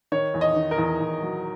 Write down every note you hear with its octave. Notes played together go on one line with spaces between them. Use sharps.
D#3 C#5
E2
D#5
D#3
A#4
E2
E2
F#3